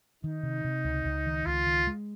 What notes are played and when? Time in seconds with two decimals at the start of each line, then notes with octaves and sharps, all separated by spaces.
0.23 D#3 D#4
0.43 C3
0.65 C3
0.85 C#2
1.05 C#2
1.26 D#3
1.46 C#2 F4
1.66 D#3
1.87 G#3